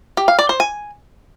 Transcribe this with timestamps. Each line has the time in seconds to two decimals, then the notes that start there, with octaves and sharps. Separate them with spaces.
0.17 G4
0.28 F5
0.39 D5
0.49 C5
0.60 G#5